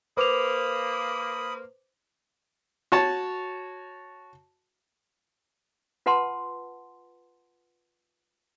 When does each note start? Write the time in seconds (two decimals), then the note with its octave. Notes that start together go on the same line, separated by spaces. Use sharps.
0.17 A#3 B4 C5 B5 D6 D#6 F7
2.92 F#4 C#5 A5
6.06 F4 B4 F#5 A5 C6